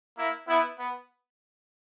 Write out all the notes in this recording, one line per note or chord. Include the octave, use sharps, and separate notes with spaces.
A#3 E4
B3 E4
B3